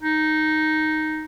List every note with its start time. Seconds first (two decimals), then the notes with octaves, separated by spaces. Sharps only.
0.02 D#4